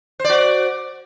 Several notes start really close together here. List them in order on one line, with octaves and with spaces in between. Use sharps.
C5 D5 F#4